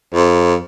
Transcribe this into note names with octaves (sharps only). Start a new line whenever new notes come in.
F2